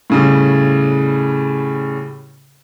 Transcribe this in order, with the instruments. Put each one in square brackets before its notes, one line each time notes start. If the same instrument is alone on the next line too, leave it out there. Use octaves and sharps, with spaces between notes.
[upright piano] A2 C#3 G3